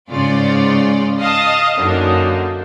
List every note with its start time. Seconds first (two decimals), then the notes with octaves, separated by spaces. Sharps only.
0.11 G#2 C#3 F4 D5
1.19 D#5 F5 A5 D#6
1.77 F#2 D3 F#3 A#3 D4 D#4